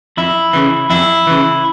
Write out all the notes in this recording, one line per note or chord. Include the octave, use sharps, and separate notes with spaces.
F2 E4
C#3 E3
F2 E4
C#3 E3